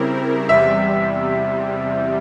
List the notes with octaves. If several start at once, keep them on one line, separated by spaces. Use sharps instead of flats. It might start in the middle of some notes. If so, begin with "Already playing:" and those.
Already playing: C#3 G3 C4 E4 A#4
E2 C3 G3 E5